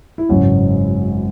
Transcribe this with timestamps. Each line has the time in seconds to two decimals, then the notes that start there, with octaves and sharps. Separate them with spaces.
0.18 E4
0.29 G#1 F#2 C#3 F#3 C#4